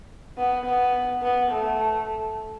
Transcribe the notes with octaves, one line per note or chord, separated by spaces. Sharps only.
B3
B3
B3
A3